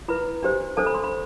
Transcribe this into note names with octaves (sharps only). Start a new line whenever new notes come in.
E4 B4 B5
D4 G4 C5
D4 A4 C5 A5
B5
C6
B5